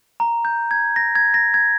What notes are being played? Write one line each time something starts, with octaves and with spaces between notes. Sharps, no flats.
A#5
G6
G#6
A#6
G#6
A#6
G#6